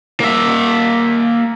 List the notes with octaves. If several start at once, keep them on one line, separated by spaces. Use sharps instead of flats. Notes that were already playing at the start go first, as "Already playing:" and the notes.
A#3 E5